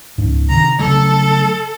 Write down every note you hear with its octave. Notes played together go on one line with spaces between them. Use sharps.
C#2 G#2
C3 D#3 A#5
C#3 F#3 A3 A4